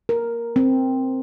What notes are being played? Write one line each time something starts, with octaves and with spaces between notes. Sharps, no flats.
A#4
C4